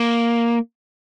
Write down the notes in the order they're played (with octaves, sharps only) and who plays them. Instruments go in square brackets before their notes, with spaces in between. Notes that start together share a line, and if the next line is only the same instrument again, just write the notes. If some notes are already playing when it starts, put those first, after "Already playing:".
Already playing: [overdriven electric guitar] A#3